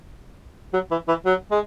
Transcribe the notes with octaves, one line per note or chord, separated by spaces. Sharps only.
F#3
E3
E3
F#3
G#3